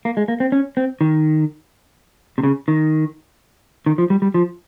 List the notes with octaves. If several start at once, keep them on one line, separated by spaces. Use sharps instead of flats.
A#3
G#3
A#3
C4
C#4
C4
D#3
C3
C#3
D#3
D#3
F3
G3
G3
F3